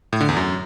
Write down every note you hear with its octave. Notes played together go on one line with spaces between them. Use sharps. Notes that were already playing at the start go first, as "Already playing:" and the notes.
A2
D3
E2
F#2